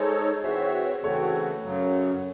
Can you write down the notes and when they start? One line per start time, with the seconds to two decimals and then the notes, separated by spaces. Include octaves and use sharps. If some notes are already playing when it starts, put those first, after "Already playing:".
Already playing: G#3 D#4 G#4 A4 C5 C#5
0.43 E3 C4 F#4 G#4 C5 C#5 E5
1.03 C#3 E3 A3 C4 F#4 A4 C#5
1.63 F#2 C#3 F#3